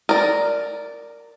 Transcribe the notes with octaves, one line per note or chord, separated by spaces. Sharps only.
A#4 D5